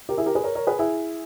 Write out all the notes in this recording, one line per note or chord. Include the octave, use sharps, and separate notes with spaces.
G4 A#4
E4 G#4
G4 A#4
G#4 B4
A#4 C#5
A#4 C#5
G#4 B4
E4 G#4